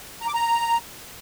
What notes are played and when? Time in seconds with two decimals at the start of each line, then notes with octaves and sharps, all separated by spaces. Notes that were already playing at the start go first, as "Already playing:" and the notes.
0.21 A#5
0.28 D6
0.34 A#5